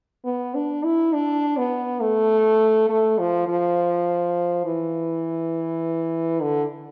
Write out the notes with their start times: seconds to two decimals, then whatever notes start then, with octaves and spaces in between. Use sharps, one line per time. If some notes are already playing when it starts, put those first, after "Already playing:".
0.25 B3
0.55 D4
0.84 E4
1.13 D4
1.58 B3
2.01 A3
2.89 A3
3.19 F3
3.48 F3
4.65 E3
6.41 D3